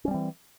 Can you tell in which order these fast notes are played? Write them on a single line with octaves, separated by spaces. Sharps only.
C#4 G3 C4 E3